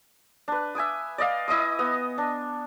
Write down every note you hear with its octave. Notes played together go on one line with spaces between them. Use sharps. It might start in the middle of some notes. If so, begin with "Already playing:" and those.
D4 B4
E5 G#5 D6 D#6
D5 D#5 F5
E4 D#5 D6 D#6
B3 D#6
D4